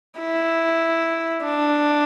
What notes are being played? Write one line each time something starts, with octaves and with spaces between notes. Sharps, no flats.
E4
D4